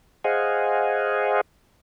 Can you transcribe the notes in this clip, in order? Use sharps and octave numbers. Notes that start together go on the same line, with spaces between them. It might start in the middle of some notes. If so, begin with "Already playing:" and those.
G#4 C5 D#5 F5 F#5 G#5